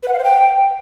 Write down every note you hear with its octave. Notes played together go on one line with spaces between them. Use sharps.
B4
F#5
F5
C5
G5